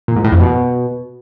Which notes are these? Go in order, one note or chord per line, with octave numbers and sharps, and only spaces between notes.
A#2
G#2
A2
F2
B2